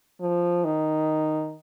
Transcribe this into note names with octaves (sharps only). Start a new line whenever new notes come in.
F3
D#3